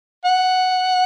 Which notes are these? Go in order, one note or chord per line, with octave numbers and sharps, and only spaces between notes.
F#5